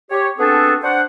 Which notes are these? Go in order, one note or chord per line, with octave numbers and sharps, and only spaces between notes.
G4 C#5
B3 C4 D4 F#4 G#4 A4
D4 C5 F#5